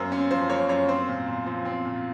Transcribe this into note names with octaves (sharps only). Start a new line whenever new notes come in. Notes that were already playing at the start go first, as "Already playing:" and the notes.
Already playing: F#2 A#3 C5
C#4
F3 C5
A#3 C#5
F#2 C#5
C4 C5
A#2
A#2
F3
C4
A#2